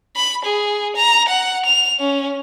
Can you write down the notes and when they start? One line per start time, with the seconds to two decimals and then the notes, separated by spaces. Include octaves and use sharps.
0.16 B5
0.45 G#4
0.96 A#5
1.28 F#5
1.65 F7
2.00 C#4